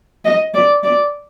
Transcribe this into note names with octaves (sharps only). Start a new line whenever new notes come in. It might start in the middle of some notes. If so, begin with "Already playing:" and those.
D#5
D5
D5